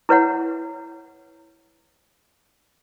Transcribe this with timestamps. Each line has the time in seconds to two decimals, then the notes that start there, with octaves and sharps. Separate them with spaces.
0.09 E4 B4 C#5 F#5